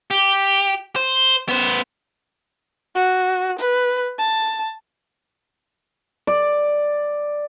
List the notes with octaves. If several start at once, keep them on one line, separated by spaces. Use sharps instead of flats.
G4
C5
B3 C5
F#4
B4
A5
D5